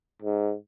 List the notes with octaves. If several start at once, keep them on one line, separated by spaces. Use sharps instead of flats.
G#2